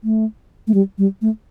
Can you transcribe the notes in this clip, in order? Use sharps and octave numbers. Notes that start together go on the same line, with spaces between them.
A3
A3
G3
G3
A3